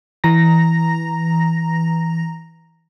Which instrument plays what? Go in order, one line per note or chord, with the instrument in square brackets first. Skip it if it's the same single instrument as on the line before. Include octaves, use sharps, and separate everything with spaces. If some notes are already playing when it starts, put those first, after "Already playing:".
[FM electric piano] E3 A#5 A#6